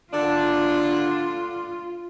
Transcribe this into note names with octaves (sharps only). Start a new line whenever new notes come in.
D3 D4 F4